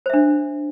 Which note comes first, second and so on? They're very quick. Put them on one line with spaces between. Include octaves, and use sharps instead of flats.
C5 E5 D4